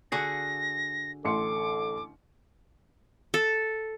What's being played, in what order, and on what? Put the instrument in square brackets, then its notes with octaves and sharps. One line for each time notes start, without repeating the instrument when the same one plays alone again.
[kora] D3 F#4 G#4 [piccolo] A#6
[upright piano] A1 C6 C#7 [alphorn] A4 [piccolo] D6
[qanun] A4